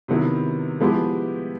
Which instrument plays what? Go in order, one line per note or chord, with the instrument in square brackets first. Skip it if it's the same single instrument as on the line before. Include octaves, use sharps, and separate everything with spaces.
[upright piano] C3 D#3 F#3 B3 E4
F3 G#3 B3 E4 G4